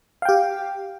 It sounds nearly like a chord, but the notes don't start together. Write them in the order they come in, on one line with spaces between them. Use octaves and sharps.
F5 G5 G4